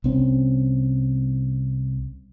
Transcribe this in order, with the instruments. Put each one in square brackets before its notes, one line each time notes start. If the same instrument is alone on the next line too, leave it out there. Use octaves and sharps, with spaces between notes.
[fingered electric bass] C2 C4 C#4